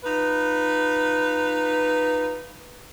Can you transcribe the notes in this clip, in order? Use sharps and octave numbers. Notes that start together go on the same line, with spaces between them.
D#4 F4 B4